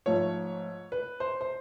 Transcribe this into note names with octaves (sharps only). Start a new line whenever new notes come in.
G#2 F3 A3 C#5
B4
C5
C5